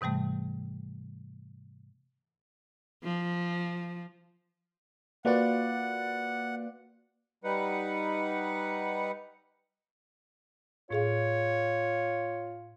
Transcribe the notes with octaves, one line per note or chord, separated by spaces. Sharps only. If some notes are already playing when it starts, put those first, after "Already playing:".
G#2 C3 E3 G3 A3
F3
A#3 F4 F#4 B4 D5 F#5
G3 D#4 B4 F#5
A2 F4 G#4 C#5 F5